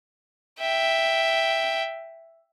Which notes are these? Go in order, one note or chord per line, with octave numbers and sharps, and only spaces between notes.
E5 G5